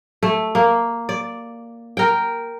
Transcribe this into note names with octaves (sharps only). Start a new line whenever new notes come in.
A3
A#3
D5
A#4 G5